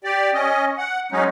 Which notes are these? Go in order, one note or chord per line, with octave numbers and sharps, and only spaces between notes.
G4 D5
C#4 D#5
F#5
F#3 G#3 C#4 D#4